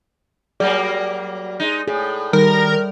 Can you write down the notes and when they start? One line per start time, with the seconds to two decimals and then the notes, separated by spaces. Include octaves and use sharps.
0.60 F#3 G3 A#3 G#4 D5
1.60 G#3 D#4
1.87 A2 G#4
2.33 D#3 G3 A#4